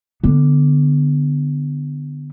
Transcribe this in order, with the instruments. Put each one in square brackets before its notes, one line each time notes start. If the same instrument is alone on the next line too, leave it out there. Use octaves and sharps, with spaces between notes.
[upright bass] D3 B3